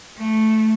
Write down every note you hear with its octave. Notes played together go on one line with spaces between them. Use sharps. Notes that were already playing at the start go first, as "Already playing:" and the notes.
A3